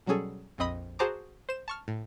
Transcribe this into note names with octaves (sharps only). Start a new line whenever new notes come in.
B2 F#3 G3 C#4 G#4 A4
A#1 F2 C4 D#5 B5 D#6
F#4 G#4 C5 A5 A#5 D6
C5 E7
A5 C#6 F6
A2